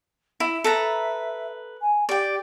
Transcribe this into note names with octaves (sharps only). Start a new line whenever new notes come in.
E4 E5
A4 B4 A#5
G#5
G4 D5 G5